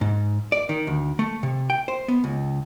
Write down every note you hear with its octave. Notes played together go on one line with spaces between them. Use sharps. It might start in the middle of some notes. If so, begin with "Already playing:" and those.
G#2
D5
D#3
D2
A3
C3
G5
C5
B3
C#2